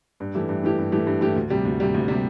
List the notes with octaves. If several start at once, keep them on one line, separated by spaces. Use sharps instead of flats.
G2
E3 A3 E4 G4
G2
E3 A3 E4 G4
G2
E3 A3 E4 G4
G2
E3 A3 E4 G4
D2
C3 G3
D2
C3 G3
D2
C3 G3